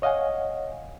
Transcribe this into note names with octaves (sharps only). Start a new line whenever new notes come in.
C#5 D#5 F5 F#5 G#5